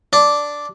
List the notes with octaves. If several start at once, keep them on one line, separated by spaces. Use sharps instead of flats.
D4